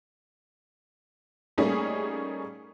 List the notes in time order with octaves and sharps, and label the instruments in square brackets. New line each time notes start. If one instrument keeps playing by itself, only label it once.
[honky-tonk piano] G3 A3 A#3 C#4 D#4 G#4